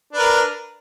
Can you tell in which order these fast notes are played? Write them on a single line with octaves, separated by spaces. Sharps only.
D4 B4 A#4